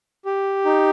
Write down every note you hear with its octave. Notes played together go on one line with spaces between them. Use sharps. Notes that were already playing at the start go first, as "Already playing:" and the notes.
G4
D#4